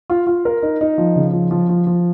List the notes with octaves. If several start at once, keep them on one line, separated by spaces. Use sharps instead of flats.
F4
F4
A#4
D#4
D#4
F3
C#3
F3
F3
F3
F3